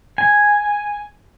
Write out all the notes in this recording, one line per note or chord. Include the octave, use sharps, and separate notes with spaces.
G#5